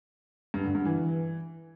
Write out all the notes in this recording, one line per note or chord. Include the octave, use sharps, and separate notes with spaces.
G2
D3
G2
E3